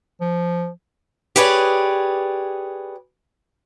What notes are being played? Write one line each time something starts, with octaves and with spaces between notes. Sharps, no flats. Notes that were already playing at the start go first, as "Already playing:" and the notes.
F3
G4 G#4 B4 C#5 D5